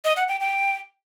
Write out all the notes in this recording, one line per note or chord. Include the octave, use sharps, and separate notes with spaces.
D#5
F#5
G5
G5